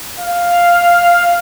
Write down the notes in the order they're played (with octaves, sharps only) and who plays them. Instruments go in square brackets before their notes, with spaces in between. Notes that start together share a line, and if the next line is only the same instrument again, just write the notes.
[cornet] F5